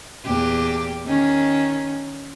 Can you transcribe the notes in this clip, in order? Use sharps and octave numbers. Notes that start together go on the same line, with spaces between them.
E2 A#2 G4
D#3 C#4